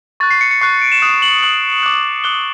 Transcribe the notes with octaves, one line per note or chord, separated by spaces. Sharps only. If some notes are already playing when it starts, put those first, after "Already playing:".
C#6 F#6 A6
C7
C#7
C#7
C#6 F#6 C7
D7
E7
D#6 F#6
F#7
D#6 F#6 F#7
D6 F#6
D6 F#6 G7